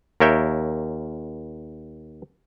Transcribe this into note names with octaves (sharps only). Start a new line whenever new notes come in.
D#2 A#4 C#5 E5 G5